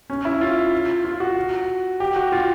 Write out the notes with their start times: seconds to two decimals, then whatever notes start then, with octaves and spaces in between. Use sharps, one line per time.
0.10 C#4
0.25 E4
0.41 F4
1.05 F4
1.20 F#4
2.00 G4
2.16 F#4
2.32 F4